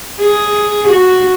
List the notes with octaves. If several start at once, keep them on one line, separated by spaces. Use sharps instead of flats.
G#4
F#4